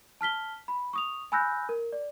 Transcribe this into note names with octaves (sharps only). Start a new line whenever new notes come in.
A5 F6 B6 G7
B5
C#6 D#6 F7
G#5 B5 E6 F#6 G6 A#6
A#4
D5